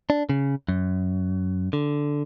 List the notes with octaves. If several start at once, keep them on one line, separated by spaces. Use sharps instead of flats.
D4
C#3
F#2
D3